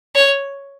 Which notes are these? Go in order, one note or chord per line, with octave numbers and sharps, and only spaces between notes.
C#5